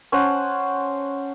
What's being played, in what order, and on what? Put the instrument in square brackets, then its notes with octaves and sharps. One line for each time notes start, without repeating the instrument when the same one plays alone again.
[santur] C#4 C5 F#5 A5